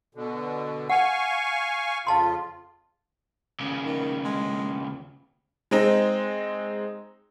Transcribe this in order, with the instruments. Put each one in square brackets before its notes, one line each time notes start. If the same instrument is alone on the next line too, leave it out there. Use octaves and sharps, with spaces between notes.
[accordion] B2 D3
[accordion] F5 G#5 C#6 [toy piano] F#5
[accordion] F2 C#3 F4 [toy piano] F5 A5 C6
[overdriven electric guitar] D#2 C#3
[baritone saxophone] D#3
G#3
[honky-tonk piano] G#3 C4 D#4